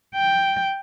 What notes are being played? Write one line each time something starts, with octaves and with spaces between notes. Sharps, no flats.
G5